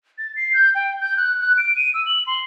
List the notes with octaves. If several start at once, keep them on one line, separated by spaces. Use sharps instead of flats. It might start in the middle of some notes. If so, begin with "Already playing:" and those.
A6
C7
G6
G5
G6
F#6
F#6
D7
D#7
E6
F#7
C6